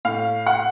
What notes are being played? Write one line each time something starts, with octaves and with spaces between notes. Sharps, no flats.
A2 F5
F#5